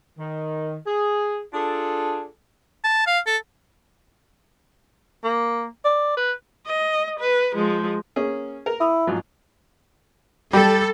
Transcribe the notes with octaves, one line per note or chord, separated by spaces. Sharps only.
D#3
G#4
D4 F4 G#4 A4
A5
F5
A4
A#3
D5
B4
D#5
B4
F3 G#3
A#3 C#4 G#4
A#4
E4 D#6
G#2 F3 F#3
G3 A4